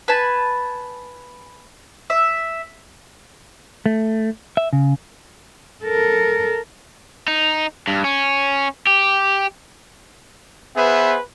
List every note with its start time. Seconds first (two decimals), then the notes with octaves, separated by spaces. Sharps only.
0.08 B4 G#5 A5 B5
2.10 E5
3.86 A3
4.57 E5
4.73 C#3
5.83 A4 A#4
7.28 D#4
7.88 G2
8.04 C#4
8.87 G4
10.77 B3 G#4 B4 C5 E5